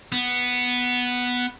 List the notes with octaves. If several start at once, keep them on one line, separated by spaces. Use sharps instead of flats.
B3